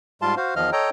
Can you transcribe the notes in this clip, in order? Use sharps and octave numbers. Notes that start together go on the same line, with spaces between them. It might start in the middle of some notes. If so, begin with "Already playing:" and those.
G#2 G3 F4 F5 A5 C6
F#4 C5 F5
E2 D#3 F3 D#5 F5 F6
A4 C#5 D#5 G5 A#5